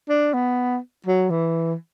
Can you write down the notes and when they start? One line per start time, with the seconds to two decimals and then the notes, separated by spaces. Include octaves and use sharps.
0.09 D4
0.34 B3
1.07 F#3
1.30 E3